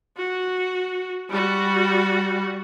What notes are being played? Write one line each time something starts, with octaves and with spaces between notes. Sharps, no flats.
F#4
G3 F#4